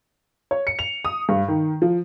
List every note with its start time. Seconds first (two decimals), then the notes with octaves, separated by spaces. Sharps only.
0.51 C#5
0.67 C#7
0.79 F7
1.05 D#6
1.29 G2
1.48 D#3
1.82 F3